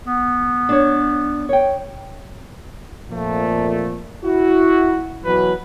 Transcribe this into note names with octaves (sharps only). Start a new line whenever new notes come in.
B3
D4 C#5
C#5 G5
F2 A#2 F3 A3
E4 F#4
B2 E3 F#3 B4